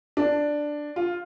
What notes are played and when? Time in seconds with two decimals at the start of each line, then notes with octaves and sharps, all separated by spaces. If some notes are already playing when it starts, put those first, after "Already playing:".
0.17 D4
0.96 F4